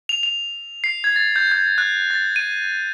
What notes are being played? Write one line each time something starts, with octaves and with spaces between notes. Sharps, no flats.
F7
F7
C7
G#6
A6
G6
G6
F#6
A6
D#7